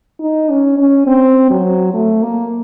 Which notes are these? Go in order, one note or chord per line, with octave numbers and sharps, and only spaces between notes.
D#4
C#4
C#4
C4
F#3
A3
A#3